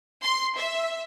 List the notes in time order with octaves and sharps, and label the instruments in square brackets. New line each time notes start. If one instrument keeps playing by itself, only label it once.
[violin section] C6
E5